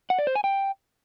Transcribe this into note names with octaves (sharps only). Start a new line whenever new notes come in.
F#5
D5
C5
G#5
G5